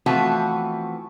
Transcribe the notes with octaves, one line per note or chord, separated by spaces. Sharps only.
E3 F3 A3 B3 C4 F#4